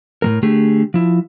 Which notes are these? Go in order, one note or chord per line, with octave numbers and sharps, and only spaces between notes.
A2 G#3 A#4
D3 A3 G4 G#4
F3 E4